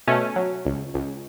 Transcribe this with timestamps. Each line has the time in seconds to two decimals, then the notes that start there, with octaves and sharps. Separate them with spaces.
0.07 B2 A3 C#4
0.36 F#3
0.65 C#2
0.94 C#2